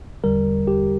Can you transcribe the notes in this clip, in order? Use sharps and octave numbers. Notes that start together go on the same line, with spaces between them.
E2 D3 G3 A#4
G4